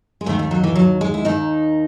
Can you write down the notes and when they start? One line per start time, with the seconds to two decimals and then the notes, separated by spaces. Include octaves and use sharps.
0.21 G#3
0.26 D#2 D#3 A3
0.39 A3
0.51 F#3
0.63 E3
0.75 F#3
1.01 G#3
1.14 E4
1.25 D#2 D#3 D#4